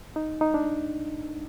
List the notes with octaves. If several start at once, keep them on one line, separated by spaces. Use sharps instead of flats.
D#4
D#4
D4